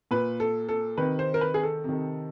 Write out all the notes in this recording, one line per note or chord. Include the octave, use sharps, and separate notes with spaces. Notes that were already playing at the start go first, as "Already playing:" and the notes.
A#2 B4
A4
A4
C3 D#3 B4
C5
A#4
B4
G#4
A4
C3 D#3